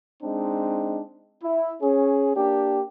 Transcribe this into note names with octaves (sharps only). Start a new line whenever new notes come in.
G#3 C4 D4 D#4
E4
C#4 G#4
A#3 D4 G4